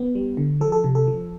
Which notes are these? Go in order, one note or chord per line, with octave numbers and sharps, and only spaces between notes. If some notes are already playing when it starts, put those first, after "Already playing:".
Already playing: B3
G3
D3
F3 A4
A4
C3
A4
F3